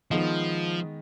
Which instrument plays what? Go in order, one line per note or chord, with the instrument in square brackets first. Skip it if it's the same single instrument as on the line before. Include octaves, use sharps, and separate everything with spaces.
[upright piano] D#3 G#3 B3 D#4 [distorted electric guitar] F3